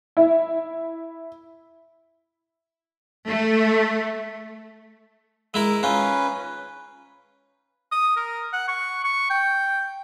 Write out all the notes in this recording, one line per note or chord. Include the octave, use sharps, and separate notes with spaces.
E4
A3
G#3 E4 A#4 E6
C#4 D#4 F4 B4
D#6
A#4
F#5
C#6
C#6
G5